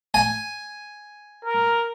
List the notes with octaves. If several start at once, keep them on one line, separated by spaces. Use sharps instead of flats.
G#5
A#4